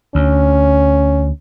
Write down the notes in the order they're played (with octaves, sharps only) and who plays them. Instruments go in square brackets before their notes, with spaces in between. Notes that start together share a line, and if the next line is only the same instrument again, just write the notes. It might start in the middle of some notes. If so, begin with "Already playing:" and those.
[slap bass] D2 [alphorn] C#4